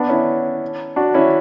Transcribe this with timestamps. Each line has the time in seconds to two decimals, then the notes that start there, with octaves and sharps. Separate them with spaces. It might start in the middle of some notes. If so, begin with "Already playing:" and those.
Already playing: B3 D4
0.09 C#4 E4
0.96 D4 F#4
1.14 C#4 E4